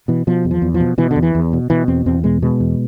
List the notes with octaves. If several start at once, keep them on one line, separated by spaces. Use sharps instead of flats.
B2 E3
B2 F3
E2
F3
E2
F3
B2
B2 E3
D3
E2
E3
E2
B2
B2 E3
E2 C4
E2 C4
B2 G#3
B2 G#3
E2